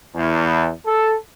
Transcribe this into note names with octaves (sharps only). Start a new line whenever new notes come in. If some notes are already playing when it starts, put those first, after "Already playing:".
E2
A4